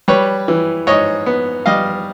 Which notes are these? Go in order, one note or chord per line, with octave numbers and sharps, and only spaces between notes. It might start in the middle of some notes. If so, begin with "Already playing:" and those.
G3 B4 C#5
E3
G#2 C#5 D#5
B3
G3 D#5 F5